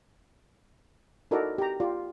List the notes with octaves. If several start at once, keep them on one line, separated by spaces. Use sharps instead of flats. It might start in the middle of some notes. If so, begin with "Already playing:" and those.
D#4 E4 F#4 A4 A#4 D5
G4 A#5
F4 G4 D5